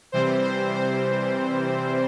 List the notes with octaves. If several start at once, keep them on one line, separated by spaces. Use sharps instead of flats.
C3 E3 G3 C4 C5
C5
C5